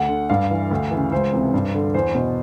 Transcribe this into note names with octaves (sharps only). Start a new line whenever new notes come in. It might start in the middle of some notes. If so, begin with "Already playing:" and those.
Already playing: D2 F#5
D3
G2 F5
E3
D2
E3
C#3
C#2 C5
C3 E3
G2
D3
E2 C5
B2